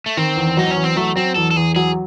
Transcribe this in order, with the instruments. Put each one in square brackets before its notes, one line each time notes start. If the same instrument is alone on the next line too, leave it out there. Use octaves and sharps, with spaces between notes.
[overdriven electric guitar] A3
[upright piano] D#3 [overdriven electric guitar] C4
[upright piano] E2
[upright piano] F#3 [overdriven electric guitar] D#4
[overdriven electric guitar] C#4
[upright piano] E2
[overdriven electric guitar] C4
[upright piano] F#3 [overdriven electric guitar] A3
[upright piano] F#3 [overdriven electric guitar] C4
[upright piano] E2 [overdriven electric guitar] A4
[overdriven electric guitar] A4
[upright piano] E2 [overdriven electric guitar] G#4
[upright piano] F#3 [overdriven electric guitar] G#4